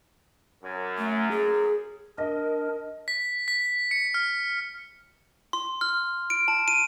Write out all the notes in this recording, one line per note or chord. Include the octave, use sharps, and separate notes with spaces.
F#2
A3
G#4
D4 A#4 D#5
B6
B6
C#7
F6
C6
F6
D7
A5
D#7